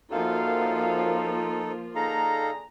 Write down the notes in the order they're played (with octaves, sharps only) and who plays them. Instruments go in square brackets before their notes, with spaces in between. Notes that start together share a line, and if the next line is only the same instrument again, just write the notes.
[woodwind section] F#2 F5 [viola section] F3 A#3 F4 [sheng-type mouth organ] D#4 A4
[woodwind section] D3 G#4 A#5 [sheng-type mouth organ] D#4 A4 F5